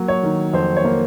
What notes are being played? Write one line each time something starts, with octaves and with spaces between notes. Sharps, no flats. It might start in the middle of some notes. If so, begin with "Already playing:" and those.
Already playing: F#3 A#3
C#5
D#3
F2 C5
C#5
A#3